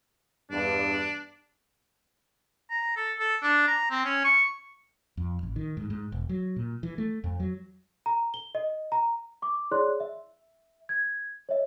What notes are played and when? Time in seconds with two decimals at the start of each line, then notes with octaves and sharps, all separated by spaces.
0.51 E2 G2 D4
2.70 A#5
2.96 A4
3.19 A4
3.43 D4
3.68 A#5
3.91 C4
4.05 C#4
4.25 C#6
5.17 F2
5.43 A1
5.56 D#3
5.77 G#2
5.90 G#2
6.12 E1
6.29 F#3
6.56 A#2
6.83 E3
6.98 A3
7.24 F2
7.40 F#3
8.06 A#5
8.34 G7
8.55 D#5
8.92 A#5
9.42 C#6 D6
9.71 E4 G#4 C#5 D5 C6 F#6
10.00 E5
10.89 G#6
11.49 C#5 D#5 E5